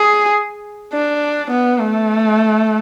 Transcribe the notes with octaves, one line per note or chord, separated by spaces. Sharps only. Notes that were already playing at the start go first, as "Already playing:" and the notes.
Already playing: G#4
D4
B3
A3